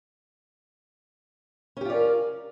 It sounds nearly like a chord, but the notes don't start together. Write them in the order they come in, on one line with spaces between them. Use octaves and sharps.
C#4 G4 F4 D5 A#4